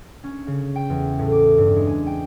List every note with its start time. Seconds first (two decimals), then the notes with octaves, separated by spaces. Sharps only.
0.24 C#4
0.47 C#3
0.76 G5
0.90 E2
1.19 A2
1.32 D6
1.58 G2
1.76 G#3
1.87 G#5
2.07 G5